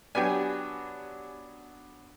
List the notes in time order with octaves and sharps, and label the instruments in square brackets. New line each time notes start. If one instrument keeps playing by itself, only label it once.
[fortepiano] F#3 B3 D4 [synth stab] G4 G#5